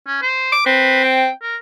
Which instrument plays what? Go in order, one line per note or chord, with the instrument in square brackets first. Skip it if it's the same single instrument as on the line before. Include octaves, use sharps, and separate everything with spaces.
[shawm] C#4
C5
[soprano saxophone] D6
[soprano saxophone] C4 [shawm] B4
[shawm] G5
A#4